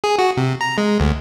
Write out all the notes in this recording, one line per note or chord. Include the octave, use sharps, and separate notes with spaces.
G#4
F#4
C3
A#5
G#3
D2